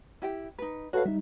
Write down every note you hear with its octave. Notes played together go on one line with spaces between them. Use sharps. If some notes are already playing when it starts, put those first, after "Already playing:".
E4 G4 G5
D#4 B4
F#4 A4 B4 C#5 F5
G3 D#4 E5